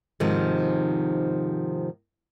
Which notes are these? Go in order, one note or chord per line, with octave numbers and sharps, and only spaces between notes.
G#2 C3 D#3 F3